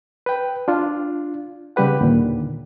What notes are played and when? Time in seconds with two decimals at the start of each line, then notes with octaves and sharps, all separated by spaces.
0.26 B4 G5
0.68 D4 F4
1.76 C#3 G3 G4 B4 F#5
2.01 D#2 A#2 D3